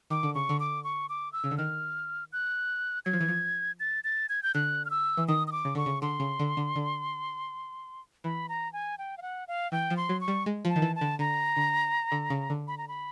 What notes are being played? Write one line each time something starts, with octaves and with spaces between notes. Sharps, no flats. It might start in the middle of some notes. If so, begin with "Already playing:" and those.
D#3 D6
D3
C#3 C#6
D3
D6
C#6
D6
E6
C#3
D3
D#3 F6
F#6
F#3 G#6
F3
E3
F3
A6
A6
G#6
G6
D3 F#6
F6
E6
E3
D#3 D#6
D#6
D6
C#3
D3 C#6
C#3
D3 C6
C#3
D3
D3
D3
E3 B5
A#5
G#5
G5
F5
F#5
F5
E3 G5
F3
C6
F#3
C#6
G3
G#3
F3
A5
D#3
E3
A5
D3
D3 A#5
D3
D3
C#3
D3
B5
A#5
B5